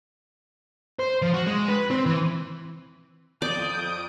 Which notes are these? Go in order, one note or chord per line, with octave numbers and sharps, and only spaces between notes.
C5
F3
F#4
G#3
B4
C4
E3
F2 D5 D6 D#6 G6 D7